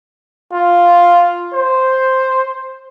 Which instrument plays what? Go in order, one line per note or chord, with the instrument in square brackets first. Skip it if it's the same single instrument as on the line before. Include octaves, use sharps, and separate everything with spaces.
[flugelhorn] F4
C5